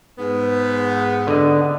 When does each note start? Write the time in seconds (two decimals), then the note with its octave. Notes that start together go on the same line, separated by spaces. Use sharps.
0.18 G#2 B3
1.27 D3 D#5